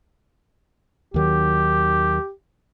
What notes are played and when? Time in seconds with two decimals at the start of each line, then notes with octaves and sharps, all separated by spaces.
1.14 D#2 D#3 F#3 G4